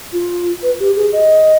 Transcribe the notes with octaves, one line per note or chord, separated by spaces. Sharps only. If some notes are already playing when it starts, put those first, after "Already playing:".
F4
B4
G4
G#4
D#5